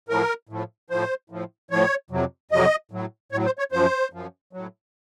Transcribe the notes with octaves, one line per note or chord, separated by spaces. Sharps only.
A2 F3 A#4
A2 F3
A2 F3 C5
A2 F3
A2 F3 C#5
F2 C3 F#3
F2 C3 F#3 D#5
A2 F#3
A2 F#3 C#5
C5
C#5
F#2 F3 C5
F#2 F3
A2 F#3